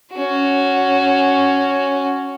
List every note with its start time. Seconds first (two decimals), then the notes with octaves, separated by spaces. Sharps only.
0.14 C#4 F#4